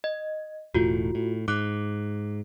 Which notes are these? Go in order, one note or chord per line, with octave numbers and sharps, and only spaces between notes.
D#5
E1 A2 F4 F#4
A2
G#2 D6 F#6